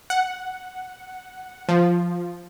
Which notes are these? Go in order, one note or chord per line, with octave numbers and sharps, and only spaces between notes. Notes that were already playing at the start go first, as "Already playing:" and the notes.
F#5
F3